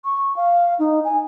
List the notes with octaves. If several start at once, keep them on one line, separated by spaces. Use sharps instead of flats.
C#6
F5
D#4
G#5